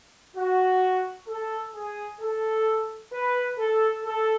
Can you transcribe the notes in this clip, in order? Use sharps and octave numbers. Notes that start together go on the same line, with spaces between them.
F#4
A4
G#4
A4
B4
A4
A4